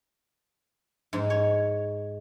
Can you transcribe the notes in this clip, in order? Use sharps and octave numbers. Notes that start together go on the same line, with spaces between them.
G#2
C#5